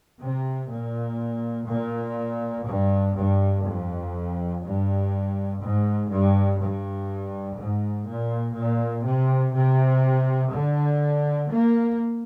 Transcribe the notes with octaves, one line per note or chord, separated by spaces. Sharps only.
C3
A#2
A#2
G2
G2
F2
G2
G#2
G2
G2
G#2
A#2
A#2
C3
C3
D3
A#3